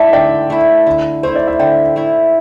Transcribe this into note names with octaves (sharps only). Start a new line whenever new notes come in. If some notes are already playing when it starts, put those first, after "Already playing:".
Already playing: A3 E4 D5 E5 A5
D3 D5 G5
A3 E4
D3
A3 E4 C5
D5
E5
D3 D5 G5
A3 E4